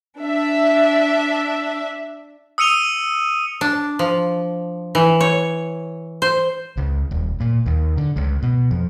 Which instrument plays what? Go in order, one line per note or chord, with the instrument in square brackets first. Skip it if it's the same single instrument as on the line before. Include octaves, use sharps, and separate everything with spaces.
[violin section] D4 E5
[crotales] D#6 E6 C#7 D#7 F7 G7
[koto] D4
F3
E3
C#5
C5
[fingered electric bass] C#2
D#1
A#2
D#2
D3
C#2
B2
F2